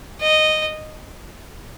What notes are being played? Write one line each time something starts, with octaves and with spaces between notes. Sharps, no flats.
D#5